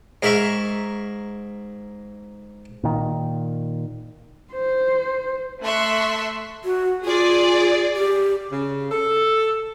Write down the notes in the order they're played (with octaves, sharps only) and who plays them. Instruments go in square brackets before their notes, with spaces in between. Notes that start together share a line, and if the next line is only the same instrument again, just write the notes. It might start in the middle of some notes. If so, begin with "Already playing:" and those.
[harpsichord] G#2 A#4 E5 B5 C#6
[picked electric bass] A#2 D#3
[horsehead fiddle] C5
[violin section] A3 E5 C6 C#6 F#6
[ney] F#4
[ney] F4 [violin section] G#4 D5
[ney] G4
[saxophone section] C#3
A4